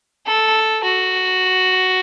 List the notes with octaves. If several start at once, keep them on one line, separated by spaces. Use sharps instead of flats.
A4
F#4